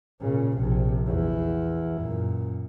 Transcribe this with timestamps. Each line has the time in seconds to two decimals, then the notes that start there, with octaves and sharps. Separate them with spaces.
0.21 A#2 C#3
0.57 A#1 C3
1.07 E2 E4
2.02 F#2 A#2